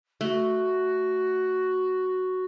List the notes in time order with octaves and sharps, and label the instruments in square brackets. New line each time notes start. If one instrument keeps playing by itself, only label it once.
[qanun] A3 [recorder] F#4